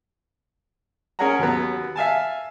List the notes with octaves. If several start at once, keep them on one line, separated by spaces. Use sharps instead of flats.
C#4 G#4 A#4 C#5 F#5 A#5
D#2 F#3 B3
E5 F5 G#5 A5